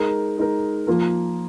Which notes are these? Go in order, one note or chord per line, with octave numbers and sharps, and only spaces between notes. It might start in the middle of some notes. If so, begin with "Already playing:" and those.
Already playing: G#3 D#4 A#4
G#3 D#4 A#4
F3 A#3 F4 A#4